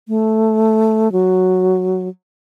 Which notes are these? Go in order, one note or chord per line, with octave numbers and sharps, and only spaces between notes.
A3
F#3